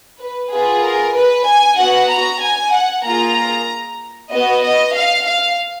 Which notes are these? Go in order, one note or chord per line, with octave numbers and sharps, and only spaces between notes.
B4
B3 F4 G#4 B4
A#4
B4
G#5
B3 F#4 F#5
A#5
G#5
F#5
A#3 F4 G#4 A#5
B3 F#4 D#5
D#5
F5
F5